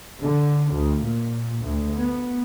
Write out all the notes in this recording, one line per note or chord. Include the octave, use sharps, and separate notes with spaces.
D3
D2
A#2
D2
B3